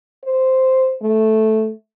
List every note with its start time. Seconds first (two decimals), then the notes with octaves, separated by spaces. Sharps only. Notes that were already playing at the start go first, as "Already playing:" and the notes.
0.24 C5
1.02 A3